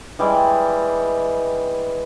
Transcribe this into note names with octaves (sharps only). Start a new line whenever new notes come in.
E3 G3 G#3 D5